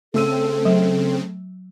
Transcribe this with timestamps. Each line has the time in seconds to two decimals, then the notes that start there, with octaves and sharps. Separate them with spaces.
0.14 C#3 A3 C4 A4 E6 D#7
0.65 F#3